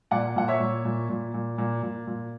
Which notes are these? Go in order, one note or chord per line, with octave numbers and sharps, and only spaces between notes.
A#2 D5 F#5
A#2 F#5
C#5 E5
A#2
A#2
A#2
A#2
A#2
A#2
A#2